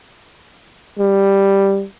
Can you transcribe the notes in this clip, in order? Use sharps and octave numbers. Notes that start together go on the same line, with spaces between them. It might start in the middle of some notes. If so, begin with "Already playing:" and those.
G3